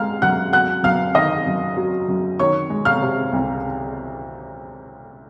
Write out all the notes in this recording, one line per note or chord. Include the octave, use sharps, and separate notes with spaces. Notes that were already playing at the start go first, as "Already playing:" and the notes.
Already playing: G#3 F5 F6
F#2 F#5 F#6
F#3 F#5 F#6
F#2 F5 F6
D#3 D#5 D#6
F#2
F#3
F#2
D#3 C#5 C#6
G#3
F5 F6
C3
C2